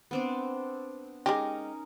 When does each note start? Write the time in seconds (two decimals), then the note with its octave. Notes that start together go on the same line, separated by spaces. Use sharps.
0.11 B3 C4 D4
1.26 G#3 C#4 D#4 G4 A#4